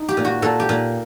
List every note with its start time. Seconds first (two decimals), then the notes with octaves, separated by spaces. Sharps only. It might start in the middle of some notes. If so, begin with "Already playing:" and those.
Already playing: D#4
0.09 G4
0.17 A#2
0.25 F#4
0.42 A#2 A4
0.60 G4
0.69 A#2